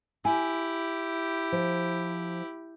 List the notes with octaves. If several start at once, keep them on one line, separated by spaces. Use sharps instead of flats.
E4 G4 G#5
F3